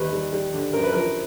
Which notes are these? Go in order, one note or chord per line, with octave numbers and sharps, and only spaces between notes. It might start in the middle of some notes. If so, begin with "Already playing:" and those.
Already playing: D#2 G3 B4
G3
G3
D3
F#2 A#4
B4
F3 A#4